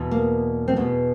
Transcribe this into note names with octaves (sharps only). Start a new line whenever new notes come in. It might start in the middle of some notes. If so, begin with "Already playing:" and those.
Already playing: E2 B2
A#3
C4
E2 B2 B3